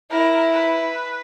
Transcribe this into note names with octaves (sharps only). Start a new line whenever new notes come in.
E4 A#4
B4